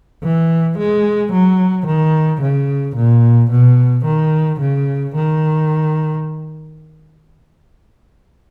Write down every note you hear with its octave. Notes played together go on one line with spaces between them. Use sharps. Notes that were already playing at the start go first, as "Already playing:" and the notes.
E3
G#3
F#3
D#3
C#3
A#2
B2
D#3
C#3
D#3